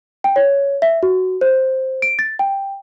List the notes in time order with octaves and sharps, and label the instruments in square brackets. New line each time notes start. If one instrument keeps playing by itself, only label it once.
[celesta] G5
C#5
E5
F#4
C5
D7
A6
G5